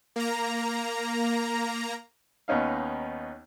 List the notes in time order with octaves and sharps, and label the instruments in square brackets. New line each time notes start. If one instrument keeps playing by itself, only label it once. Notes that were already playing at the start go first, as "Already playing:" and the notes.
[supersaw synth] A#3 A#5
[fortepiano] D#2 B3 C#4 D#4 F5